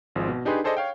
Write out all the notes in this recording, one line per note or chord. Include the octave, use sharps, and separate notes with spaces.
G#1 F3 G#3
B2
D4 D#4 G4 G#4 B4 C6
G#4 A4 C5 D5 D#5
C#5 F5 G5